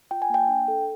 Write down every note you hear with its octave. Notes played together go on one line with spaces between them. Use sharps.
F4 G5
G#5
A#3 G5
D4
A4